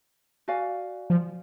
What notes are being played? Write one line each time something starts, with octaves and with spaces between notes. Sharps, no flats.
F#4 D5 F5 G#5
F3